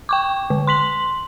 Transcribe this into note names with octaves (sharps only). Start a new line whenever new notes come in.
G5 C#6 D6
D3
C6 B6 F#7